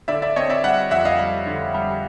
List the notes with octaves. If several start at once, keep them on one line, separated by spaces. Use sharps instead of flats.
D3 D5 E5
D5 E5
C4 C#5 D#5
D5 E5
G3 E5 F#5
F2 E5 F#5
D#5 F5
G3
D3
G3